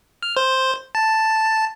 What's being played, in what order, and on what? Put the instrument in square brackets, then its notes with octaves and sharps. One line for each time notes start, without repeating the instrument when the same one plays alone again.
[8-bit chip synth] F6
C5
A5